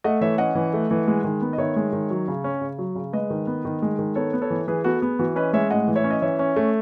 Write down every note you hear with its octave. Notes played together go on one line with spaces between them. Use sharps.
A3 D#5 F#5
E3 C#5 E5
C#4 D#5 F#5
E3
A3
E3
G#3
D#3
B3
D#5
D#3 C#5 E5
G#3
D#3
F#3
C#3
C#4
C#3
F#3
C#3
G#3 B4 D#5
D#3
B3
D#3
G#3
D#3
B3 A4 C#5
B3
A4 C#5
E3
E3 G#4 B4
B3 F#4 A4
B3 G#4
E3 F#4
C#4 B4 D#5
G#3 C#5 E5
A2 D#5 F#5
E3
C#5 E5
C#4
D#5
E3 C#5 E5
C#4
A3